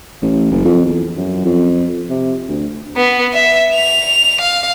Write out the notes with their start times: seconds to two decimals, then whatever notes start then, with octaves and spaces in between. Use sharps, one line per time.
0.22 A1
0.51 F#1
0.65 F2
0.86 E2
1.17 F#2
1.45 F2
2.10 C3
2.48 D2
2.96 B3
3.33 E5
3.75 F7
4.41 F5